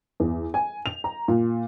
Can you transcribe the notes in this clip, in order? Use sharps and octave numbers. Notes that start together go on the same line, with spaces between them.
E2
G#5
F7
A#5
A#2